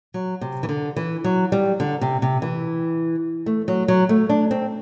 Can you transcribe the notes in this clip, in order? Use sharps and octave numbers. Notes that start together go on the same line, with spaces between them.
F#3
C3
E3
D3
E3
F#3
G3
D3
C3
C3
E3
A3
F#3
F#3
A3
D4
C4